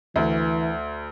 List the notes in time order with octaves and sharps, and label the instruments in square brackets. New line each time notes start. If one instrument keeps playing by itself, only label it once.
[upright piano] D2 [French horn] E3